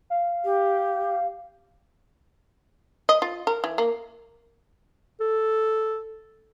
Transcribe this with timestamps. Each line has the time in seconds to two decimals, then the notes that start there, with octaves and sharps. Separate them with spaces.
0.10 F5
0.44 G4
3.09 D#5
3.22 F4
3.47 A#4
3.64 E3
3.78 A#3
5.21 A4